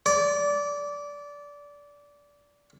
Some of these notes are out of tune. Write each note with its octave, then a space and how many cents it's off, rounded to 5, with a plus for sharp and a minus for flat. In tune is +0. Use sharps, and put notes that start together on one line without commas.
D5 -20